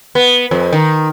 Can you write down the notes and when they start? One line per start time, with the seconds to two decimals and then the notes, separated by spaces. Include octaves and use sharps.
0.15 B3
0.51 F2
0.72 D#3